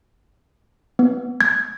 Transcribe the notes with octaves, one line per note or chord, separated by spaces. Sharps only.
B3
G#6